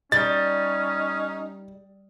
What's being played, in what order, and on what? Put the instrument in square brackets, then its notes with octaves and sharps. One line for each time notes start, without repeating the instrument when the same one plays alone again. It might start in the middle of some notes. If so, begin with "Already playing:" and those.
[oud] G3 [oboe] C#4 [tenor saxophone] D#4 [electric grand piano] A6